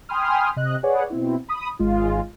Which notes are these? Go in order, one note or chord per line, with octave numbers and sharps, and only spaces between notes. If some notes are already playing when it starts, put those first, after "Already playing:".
G5 G#5 B5 C6 D#6 F6
C3 D#5 F#6
G#4 B4 C#5 D5 F#5
B2 C4 E4
B5 D#6
G#1 G#3 F4